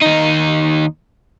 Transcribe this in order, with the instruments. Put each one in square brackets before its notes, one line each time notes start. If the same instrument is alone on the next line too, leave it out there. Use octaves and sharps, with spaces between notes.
[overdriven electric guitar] D#2 D#4